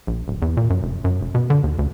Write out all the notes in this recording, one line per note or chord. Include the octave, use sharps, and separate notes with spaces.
A#1
D1
E2
A#2
F#2
F1
F#2
F1
B2
D3
D#2
D2